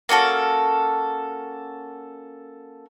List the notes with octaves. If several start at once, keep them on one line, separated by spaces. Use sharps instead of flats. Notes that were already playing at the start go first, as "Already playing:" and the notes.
A#3 C#4 F#4 A4